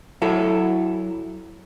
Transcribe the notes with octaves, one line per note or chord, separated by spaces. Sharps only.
F#3 E4 A4